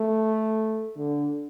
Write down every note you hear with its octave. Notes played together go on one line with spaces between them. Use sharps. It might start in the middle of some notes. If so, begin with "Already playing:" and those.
Already playing: A3
D3